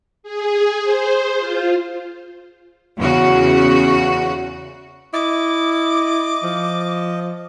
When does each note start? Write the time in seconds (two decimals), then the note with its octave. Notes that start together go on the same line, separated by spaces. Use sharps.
0.23 G#4
0.81 C5
1.38 F4
2.99 E2 C#3 F#4
5.13 E4 D#5 D6
6.43 F3